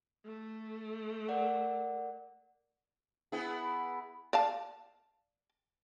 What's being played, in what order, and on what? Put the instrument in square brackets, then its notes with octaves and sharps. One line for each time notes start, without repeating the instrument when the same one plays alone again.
[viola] A3
[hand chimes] A#4 D5 F#5
[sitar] B3 E4 G#4
[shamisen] D5 F5 A5